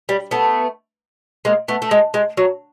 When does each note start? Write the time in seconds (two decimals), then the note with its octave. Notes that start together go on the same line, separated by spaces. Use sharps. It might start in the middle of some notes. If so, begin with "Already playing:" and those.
0.09 G3
0.31 A3 B3
1.45 G#3 A#3
1.68 A3 B3
1.82 A3
1.91 G#3
2.14 G#3
2.37 F#3